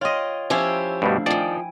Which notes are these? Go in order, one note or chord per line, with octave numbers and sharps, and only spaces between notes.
F4 C#5 D#5 G5 C6
F3 C#4 E4 G4 C5
G2 B2 G3 A3 D4 F5
D#3 F3 D5 G5 G#5